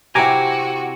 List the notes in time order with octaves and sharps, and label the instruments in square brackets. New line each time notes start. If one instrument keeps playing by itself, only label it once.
[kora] C3 C4 E4 [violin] F#4 [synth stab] G#5 A#5 D6